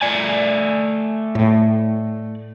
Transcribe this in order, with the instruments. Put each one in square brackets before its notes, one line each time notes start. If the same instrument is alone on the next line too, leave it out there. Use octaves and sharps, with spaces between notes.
[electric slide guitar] A3 D5 G#5
[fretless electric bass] A2